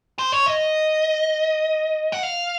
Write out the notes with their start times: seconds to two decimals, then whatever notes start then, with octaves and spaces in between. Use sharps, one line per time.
0.19 C5
0.32 C#5
0.46 D#5
2.12 F#5
2.23 F5